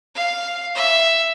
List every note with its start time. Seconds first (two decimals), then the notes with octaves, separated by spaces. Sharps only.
0.15 F5
0.75 E5